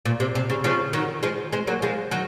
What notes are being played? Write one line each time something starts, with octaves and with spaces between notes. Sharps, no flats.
A#2
C3
C3
C#3
C#3 F3
D#3 F#3
F3 G#3
G#3 C4
F#3 A#3
F3 G#3
D#3 F#3